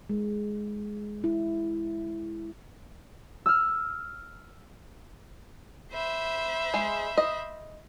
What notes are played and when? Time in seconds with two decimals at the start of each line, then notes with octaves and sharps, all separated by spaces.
0.09 G#3
1.24 E4
3.46 E6 F6
5.91 C5 E5 B5
6.74 G#3
7.18 D#5